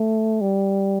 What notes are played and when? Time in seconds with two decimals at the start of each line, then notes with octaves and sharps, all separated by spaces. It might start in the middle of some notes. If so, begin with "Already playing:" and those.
Already playing: A3
0.41 G3